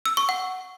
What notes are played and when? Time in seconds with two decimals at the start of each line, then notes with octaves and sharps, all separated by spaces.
0.06 E6
0.17 C#6
0.29 F#5